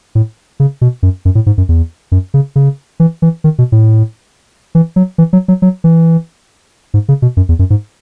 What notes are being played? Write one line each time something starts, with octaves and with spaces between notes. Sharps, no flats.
A2
C#3
B2
F#2
F#2
A2
G#2
F#2
E2
F#2
C#3
C#3
E3
E3
D#3
B2
A2
E3
F#3
E3
F#3
F#3
F#3
E3
G#2
C#3
B2
F#2
E2
F#2
G#2